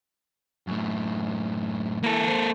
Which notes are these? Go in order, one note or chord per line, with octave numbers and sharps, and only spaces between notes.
F#2 A2
E3 A#3 A4
C5